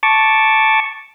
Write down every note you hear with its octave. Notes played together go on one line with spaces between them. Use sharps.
A5 C#6 D6